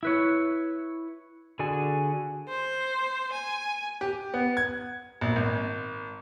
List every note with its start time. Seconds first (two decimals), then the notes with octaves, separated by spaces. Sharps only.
0.03 E4 B4 C#5
1.59 D3 F#4 G#4 D5 G#5
2.48 C5
3.32 G#5
4.01 G4
4.34 B3
4.57 G#6
5.21 A#1
5.36 G#1